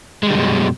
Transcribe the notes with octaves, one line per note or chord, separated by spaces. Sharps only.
F#2 B2 D3 G3 G#3